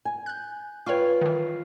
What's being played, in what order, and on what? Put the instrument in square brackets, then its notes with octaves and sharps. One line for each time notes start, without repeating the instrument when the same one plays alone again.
[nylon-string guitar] G#5
[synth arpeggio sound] F#6 G6
[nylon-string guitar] F4 B4 [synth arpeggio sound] C#5 G5 C#6
[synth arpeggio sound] D#3 E3